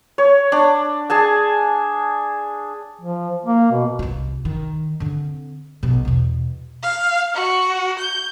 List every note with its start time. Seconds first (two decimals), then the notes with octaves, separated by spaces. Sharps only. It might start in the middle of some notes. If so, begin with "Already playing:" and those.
0.18 C#5
0.52 D4
1.10 G#4 G#5 A5
3.01 F3
3.45 A#3
3.71 B2
3.99 C2 F4
4.45 D#3
5.00 D3 C4
5.83 B1 B2
6.05 E2 B2
6.83 F5
7.35 F#4
7.99 G6